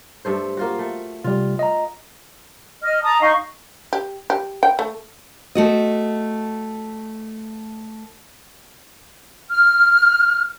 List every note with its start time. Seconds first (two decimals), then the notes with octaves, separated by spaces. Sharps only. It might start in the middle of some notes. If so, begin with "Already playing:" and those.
0.25 G2 A3 C5
0.57 A#3 F4 F#4
0.79 A3
1.24 C3 G3 F4
1.59 D#5 A#5
2.82 D#5 F6
3.03 A5 A#5 D#6
3.20 D#4 D#5 F5 C#6
3.93 G4
4.30 G4
4.63 G5
4.79 A3
5.55 A3 F#4 D#5
9.50 F6